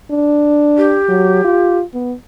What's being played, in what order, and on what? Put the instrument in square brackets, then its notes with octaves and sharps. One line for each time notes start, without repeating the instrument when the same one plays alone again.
[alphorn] D4
[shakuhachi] G4
[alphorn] F#3
F4
B3